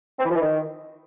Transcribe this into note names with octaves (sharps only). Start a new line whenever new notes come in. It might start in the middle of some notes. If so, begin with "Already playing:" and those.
C4
E3
F3
E3
D#3